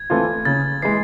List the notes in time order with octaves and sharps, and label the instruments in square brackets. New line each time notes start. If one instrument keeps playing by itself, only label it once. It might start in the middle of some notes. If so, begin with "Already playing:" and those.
Already playing: [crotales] G#6
[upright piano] E3 A3 C4 F4
[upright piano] C#3 [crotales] A6
[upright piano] E3 G#3 [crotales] C7